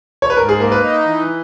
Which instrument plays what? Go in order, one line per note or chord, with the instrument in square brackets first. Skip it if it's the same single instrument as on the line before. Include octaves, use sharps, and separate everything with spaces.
[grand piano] C#5
B4
[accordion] G#2 [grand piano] A#4
[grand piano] G#4
[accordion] A#3 [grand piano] A#4
[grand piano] B4
[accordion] D#4
E3